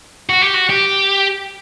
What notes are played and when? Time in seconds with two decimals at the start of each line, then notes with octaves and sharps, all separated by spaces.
0.29 F#4
0.42 G4
0.54 F#4
0.69 G4